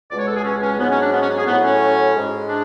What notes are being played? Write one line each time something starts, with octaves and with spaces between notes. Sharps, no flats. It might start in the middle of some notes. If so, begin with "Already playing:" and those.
C#2 B2 G#3 D5
C#5
A4
G#4
C#4
C#4
G#2 F#3 B3
C#4
D4
B3
C#4
G#4
A2 F#3 B3
C#4
G#2 G#3
D4